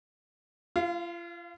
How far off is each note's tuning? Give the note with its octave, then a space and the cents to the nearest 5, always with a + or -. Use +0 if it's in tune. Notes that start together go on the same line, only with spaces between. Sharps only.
F4 -35 F5 +5